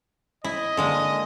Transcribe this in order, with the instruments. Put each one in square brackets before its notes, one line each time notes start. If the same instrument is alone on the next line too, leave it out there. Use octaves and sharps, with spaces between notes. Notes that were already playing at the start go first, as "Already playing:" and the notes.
[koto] E4 [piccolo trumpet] D#5
[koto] D3 G#3 A#3